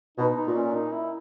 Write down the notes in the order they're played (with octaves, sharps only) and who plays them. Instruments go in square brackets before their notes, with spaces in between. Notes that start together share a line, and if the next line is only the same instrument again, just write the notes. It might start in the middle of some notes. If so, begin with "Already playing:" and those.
[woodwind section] B2 [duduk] D#4
[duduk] D#4
[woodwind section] A#2
[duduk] C#4
D#4
E4